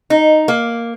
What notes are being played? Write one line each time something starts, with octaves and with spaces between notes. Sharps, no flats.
D#4
A#3